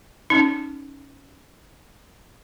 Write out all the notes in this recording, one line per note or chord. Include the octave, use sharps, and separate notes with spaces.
C#4 D#4